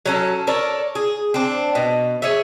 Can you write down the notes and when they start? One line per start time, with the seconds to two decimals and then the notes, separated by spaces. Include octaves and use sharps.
0.06 F#3 C#4 A4
0.47 A4 A#4 C#5 D5
0.95 G#4
1.34 C4 D4
1.75 B2
2.22 G#4 C#5 E5